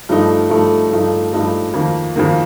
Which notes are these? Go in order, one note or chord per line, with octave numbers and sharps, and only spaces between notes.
G2 F3 A3 D#4
G2 F3 A3 D#4
G2 F3 A3 D#4
G2 F3 A3 D#4
F2 D#3 A#3
F2 D#3 A#3